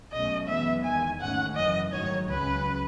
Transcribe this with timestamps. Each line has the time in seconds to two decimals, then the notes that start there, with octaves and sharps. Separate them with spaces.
0.11 B1 B2 A3 C#4 D#5
0.47 F#2 E3 G#3 B3 E5
0.84 E2 D#3 G#3 G#5
1.20 G#2 D#3 A3 C#4 F#5
1.56 F#1 F#2 E3 D#5
1.92 G#2 D#3 F#3 A3 C#5
2.29 C#2 C#3 F#3 C#4 B4